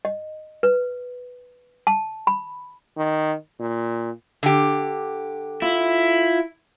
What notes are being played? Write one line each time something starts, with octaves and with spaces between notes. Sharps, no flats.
D#5
B4
A5
B5
D#3
A#2
D3 G4
E4 F4